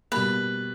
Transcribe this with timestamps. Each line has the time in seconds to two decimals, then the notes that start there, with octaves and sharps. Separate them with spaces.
0.11 B2 G3 A#3 B4